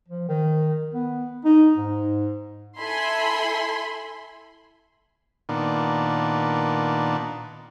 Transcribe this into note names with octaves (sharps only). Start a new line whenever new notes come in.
F3
D#3
B3
D#4
G#2
E4 A4 E5 G#5 B5 C6
A#2 D#3 B3 D4